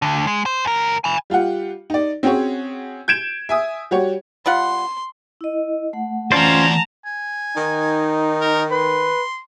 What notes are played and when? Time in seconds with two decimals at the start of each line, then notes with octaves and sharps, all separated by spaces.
0.02 D2 D3
0.27 G#3
0.46 C5
0.65 C#2 A#4
1.04 G#5 B5
1.30 G3 F4 G4 F#5
1.90 D#4 D5
2.23 C4 C#4 F#4 G#4 C#5
3.08 G6 G#6 D7 E7
3.49 E5 G#5 D#6
3.91 G3 F#4 G4 C#5
4.46 G3 F4 F#5 C6
5.41 E4 D#5
5.93 A3 F#5
6.32 E3 C#4 F4 C5 D5 A5 A#5
7.06 G#5
7.56 D#3 D#4
8.41 A#4
8.71 B4 C6